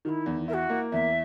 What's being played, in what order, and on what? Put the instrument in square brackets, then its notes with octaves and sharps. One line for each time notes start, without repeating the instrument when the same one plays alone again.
[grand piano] D#3 [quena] F#4
[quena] E4
[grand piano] E2
[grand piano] E4 [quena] A#4
[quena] F#4
[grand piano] A#3
[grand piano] E2 [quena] E5